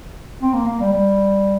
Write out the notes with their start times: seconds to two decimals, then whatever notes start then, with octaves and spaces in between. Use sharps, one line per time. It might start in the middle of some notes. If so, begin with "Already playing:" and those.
0.41 C4
0.54 A#3
0.66 A#3
0.80 G3
0.93 G3